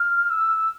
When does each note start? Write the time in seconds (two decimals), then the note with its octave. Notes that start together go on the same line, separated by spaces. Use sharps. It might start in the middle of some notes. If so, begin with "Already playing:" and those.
Already playing: F6
0.30 E6